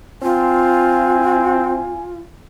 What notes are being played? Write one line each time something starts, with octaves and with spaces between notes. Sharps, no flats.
C4 F4 G#5